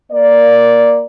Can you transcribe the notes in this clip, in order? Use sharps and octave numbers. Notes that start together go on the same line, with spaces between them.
A#3 A#4 D5